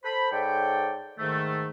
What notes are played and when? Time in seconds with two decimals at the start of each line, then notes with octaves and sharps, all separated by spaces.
0.04 A4 C5 B5
0.32 G#2 A4 C#5 D5 G5
1.19 G#2 D#3 A3